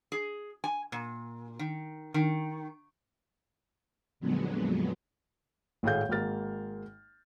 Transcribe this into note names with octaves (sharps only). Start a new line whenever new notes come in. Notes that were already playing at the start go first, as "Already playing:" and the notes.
G#4
G#5
A#2
D#3
D#3
F2 A#2 D3 F#3 G#3 B3
G#1 A2 A3 G#4 F5 G6
G#1 G#3 A#3 F6 A6